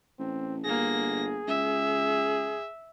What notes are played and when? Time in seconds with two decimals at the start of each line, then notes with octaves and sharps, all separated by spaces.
0.19 A1 C4
0.65 G1 A#3 G#4 A#6
1.48 C#2 E5